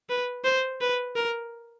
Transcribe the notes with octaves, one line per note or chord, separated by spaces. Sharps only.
B4
C5
B4
A#4